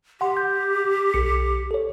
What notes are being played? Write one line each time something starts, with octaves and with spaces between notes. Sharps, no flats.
G4 F#5 C6
G6
B1 C#7
A4 C#5